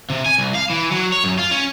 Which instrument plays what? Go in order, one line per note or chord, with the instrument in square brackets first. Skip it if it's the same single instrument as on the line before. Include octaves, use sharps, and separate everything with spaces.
[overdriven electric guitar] C3
G#5
C2
F5
E3
F#3
C#5
F#2
F4
C#4